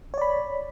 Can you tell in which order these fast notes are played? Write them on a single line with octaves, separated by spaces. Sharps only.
C#5 D5 B5